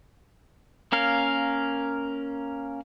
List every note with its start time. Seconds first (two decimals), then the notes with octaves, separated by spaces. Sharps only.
0.92 A#3 C#4 A#4 F5